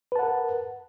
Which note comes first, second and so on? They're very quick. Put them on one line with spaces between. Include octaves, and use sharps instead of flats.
B4 A5 F#5 A#4